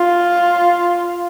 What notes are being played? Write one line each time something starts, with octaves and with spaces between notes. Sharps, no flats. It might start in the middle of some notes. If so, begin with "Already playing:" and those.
Already playing: F4